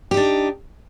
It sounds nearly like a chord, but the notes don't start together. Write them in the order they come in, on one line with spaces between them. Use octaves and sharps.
G4 D#4 D4